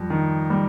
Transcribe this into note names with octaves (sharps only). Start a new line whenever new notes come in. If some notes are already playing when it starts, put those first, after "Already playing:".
Already playing: F2 G3
D#3
G3